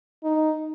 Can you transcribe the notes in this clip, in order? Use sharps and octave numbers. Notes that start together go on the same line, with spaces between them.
D#4